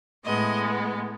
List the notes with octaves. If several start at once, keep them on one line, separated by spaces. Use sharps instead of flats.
A2 G#3 B3 D#5